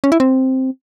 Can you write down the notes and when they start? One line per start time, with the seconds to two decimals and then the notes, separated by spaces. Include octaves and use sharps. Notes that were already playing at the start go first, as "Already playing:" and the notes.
0.04 C#4
0.12 E4
0.20 C4